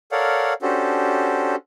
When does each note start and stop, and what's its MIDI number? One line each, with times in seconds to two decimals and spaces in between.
0.12 0.54 69
0.12 0.54 70
0.12 0.54 73
0.12 0.54 74
0.12 0.54 77
0.12 0.54 78
0.62 1.56 61
0.62 1.56 62
0.62 1.56 66
0.62 1.56 67
0.62 1.56 69
0.62 1.56 72